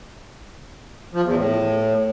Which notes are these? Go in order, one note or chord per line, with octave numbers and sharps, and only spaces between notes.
F3
E2
A2